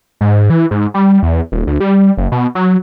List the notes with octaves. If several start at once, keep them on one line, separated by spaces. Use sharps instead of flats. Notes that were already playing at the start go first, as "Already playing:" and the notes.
G#2
E3
G#2
G3
E2
D#1
D2
G3
F#1
B2
F#3